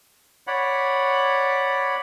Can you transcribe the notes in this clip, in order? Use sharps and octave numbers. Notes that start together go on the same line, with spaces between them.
C#5 D5 F#5 B5